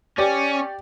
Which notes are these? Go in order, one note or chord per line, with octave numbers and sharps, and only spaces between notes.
C#4 G4 D5